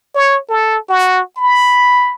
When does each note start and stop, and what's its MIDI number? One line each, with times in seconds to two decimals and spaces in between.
0.15 0.39 73
0.49 0.78 69
0.89 1.21 66
1.37 2.15 83